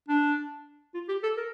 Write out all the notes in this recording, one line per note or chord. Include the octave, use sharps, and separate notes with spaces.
D4
F4
G4
A4
A#4